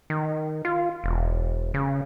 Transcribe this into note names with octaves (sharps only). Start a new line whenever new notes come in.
D#3
F4
E1
C#3